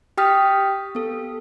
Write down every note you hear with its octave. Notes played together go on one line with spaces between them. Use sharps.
G4 G5 D#6 F6 B6
B3 A4